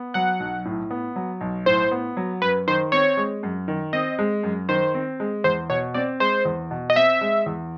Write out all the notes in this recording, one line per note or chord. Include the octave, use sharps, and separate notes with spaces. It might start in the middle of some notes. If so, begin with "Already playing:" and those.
Already playing: B3
F#3 F#5
B1
A2
B3
F#3
B1
A2 C5
B3
F#3
F#2 B4
D#3 C5
C4 C#5
G#3
F#2
D#3
C4 D#5
G#3
F#2
D#3 C5
C4
G#3
E2 C5
B2 C#5
C4 D5
G#3 C5
E2
B2
D#5
C4 E5
G#3
E2